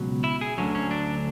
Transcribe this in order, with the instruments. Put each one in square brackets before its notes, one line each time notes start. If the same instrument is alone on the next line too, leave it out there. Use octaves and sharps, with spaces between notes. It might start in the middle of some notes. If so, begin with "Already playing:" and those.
Already playing: [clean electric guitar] C#2 B2 F#3
E4
G#4
D2 D3 F#3 C#4
C#4
D4